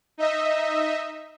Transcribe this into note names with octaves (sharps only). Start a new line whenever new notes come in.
D#4 D#5 E5